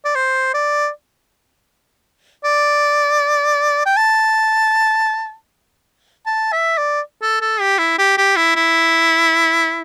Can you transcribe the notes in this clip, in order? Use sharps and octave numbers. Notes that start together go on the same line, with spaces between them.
D5
C5
D5
D5
G5
A5
A5
E5
D5
A4
A4
G4
E4
G4
G4
E4
E4